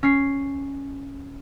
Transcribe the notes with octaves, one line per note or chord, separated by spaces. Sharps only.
C#4 C7